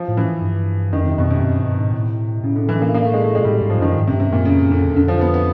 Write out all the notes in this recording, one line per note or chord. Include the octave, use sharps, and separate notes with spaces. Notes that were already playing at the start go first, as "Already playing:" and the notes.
Already playing: F3
A2
E3
G2
F2 D#3
C3
F2 B2
C3
F#2
G2
G#2
A2
A2 C#3
D3
E3
A#3
A#3
A3
G#3
A3
A#2 G#3
A2 G3
G#2
F3
F#2 D#3
G#2
C3
G2
C3
F#2 A#2
F2 C#3
F#2
F2 D3
E2
F2 D3
F3
B3
B3